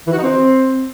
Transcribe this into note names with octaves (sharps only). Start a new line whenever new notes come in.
E3
F#4
D#4
C4